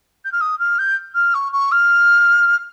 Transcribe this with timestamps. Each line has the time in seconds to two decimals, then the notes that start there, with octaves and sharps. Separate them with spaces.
0.25 G6
0.32 F6
0.41 D#6
0.59 F6
0.78 G6
1.15 F6
1.34 C#6
1.52 C#6
1.72 F6